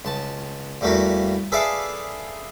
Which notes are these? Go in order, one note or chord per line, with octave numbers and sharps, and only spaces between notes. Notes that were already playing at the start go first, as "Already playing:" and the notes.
C#2 A5
E2 G3 A3 A#3 F#4
G#4 A4 B4 D5 E5 F5